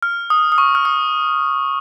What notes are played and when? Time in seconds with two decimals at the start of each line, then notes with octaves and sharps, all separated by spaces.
0.03 F6
0.30 D#6
0.52 D#6
0.58 C#6
0.75 F6
0.85 D#6